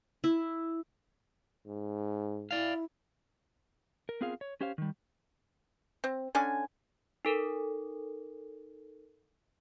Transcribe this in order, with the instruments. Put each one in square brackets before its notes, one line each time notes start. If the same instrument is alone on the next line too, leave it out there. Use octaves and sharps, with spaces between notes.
[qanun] E4
[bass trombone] G#2
[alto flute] E4 [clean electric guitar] D5 F5
[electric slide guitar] A#4
B3 C4 F4 G#4 A#4 F5
C#5
C#4 G4 C5 C#5 F5
D#3 G3
[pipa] C4
D3 C#4 D5 G#5
[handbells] D#4 A4 A#4